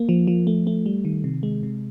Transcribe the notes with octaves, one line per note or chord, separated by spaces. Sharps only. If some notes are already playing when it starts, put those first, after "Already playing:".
Already playing: A#3
F3
F3
A3
A3
G3
D#3
C3
G#3
C3